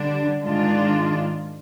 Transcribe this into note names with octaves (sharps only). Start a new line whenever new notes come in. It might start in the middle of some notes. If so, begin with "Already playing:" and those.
Already playing: D3 G3 D4
G#2 D#3 G#3 D4 F4